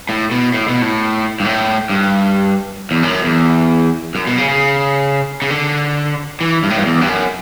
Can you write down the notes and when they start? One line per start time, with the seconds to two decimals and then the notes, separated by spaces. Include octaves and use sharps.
0.09 A2
0.31 B2
0.54 A2
0.68 B2
0.82 A2
1.40 G2
1.45 A2
1.89 G2
2.91 E2
3.03 F#2
3.24 E2
4.15 F#2
4.27 B2
4.38 C#3
4.49 C#3
5.42 C#3
5.50 D3
6.41 E3
6.63 G2
6.70 A2
6.78 G2
6.85 E2
7.01 G2
7.08 F#2